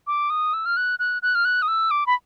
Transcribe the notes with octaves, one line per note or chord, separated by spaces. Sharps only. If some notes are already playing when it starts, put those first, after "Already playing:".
D6
D#6
E6
F6
F#6
F#6
F#6
F6
F#6
D#6
E6
D6
B5